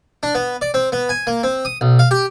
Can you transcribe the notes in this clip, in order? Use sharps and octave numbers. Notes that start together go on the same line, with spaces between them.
D4
B3
D5
C4
B3
G#5
A#3
C4
D#6
B1
F5
G4